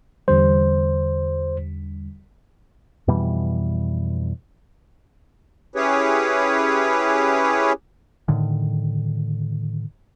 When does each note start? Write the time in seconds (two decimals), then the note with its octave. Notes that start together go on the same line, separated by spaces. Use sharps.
0.28 E2 D3 G3 C5
3.08 F2 B2 E3 G3
5.75 C#4 E4 G4 G#4 B4 C#5
8.28 A2 D3 D#3